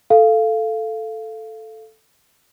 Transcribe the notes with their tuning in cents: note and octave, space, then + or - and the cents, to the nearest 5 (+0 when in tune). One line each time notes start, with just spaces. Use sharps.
A4 +0 F5 -15